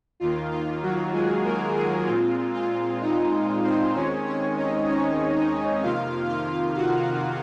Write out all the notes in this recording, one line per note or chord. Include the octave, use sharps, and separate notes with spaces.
D#2 D#3 A#3 F4
F4
F#3 F#4
G#3 G#4
A#3 A#4
G#3 G#4
A#2 G#3 C4 F4
F4
D#4
C4 C5
D#2 D#3 G#3 C4 C#4 C#5
C#4 C#5
D#4 D#5
C#4 C#5
D#4 D#5
F2 C3 D#3 A#3 F4 F5
F4 F5
F#4 F#5